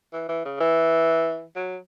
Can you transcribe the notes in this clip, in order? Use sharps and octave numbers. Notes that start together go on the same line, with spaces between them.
E3
E3
C#3
E3
F#3